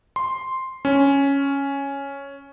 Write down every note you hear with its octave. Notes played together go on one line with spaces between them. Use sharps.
C6
C#4